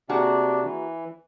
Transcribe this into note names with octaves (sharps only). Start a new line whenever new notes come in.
C3 A#3 D4 F#4 G#4
E3